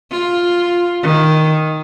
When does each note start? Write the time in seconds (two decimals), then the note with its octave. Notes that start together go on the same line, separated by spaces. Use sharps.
0.11 F4
1.02 D#3